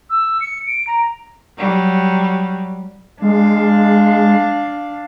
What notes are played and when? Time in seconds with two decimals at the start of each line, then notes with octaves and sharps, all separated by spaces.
0.10 E6
0.41 C#7
0.67 D7
0.87 A#5
1.58 F#3 G3
3.22 G#3 D4 F5